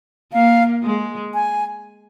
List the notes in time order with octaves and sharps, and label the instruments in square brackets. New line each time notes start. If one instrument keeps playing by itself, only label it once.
[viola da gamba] A#3 [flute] F5
[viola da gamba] G#3
[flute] G#5